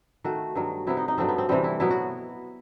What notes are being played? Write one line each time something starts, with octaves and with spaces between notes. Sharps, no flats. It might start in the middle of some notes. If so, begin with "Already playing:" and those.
D#3 A3 F#4
G2 D#3 F#3
C3 F#3 B3 E4
D#4
D#4
G2 F#3 A3 C4
B3
C4
C3 E3 G3 C4
E4
B2 F#3 B3 E4
F#4